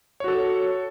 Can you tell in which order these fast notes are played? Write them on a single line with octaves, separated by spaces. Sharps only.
C#5 F#4 A4